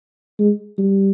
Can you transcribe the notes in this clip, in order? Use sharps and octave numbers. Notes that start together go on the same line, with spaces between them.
G#3
G3